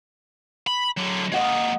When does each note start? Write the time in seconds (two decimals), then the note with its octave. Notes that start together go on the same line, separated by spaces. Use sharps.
0.67 B5
0.97 D3 F#3
1.32 G#3 A#3 D#5 F#5 D#6